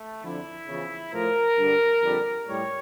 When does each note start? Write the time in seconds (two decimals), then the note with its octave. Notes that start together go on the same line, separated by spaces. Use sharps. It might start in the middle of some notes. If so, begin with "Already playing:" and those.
Already playing: A3
0.23 F2 D3 F3 E4
0.68 E2 C#3 F3
1.13 A2 F3 A#4
1.58 G2 D3 G3
2.02 F2 D3 G3
2.46 A2 G3 C#5